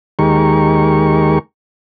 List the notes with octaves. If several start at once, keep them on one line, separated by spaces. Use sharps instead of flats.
D#2 D#3 G#3 G4 A#4 C#6